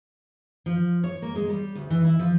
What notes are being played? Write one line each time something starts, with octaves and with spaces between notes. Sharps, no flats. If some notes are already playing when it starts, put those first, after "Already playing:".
F3
C#5
A#3
G#3
G3
D2
E3
E4
F3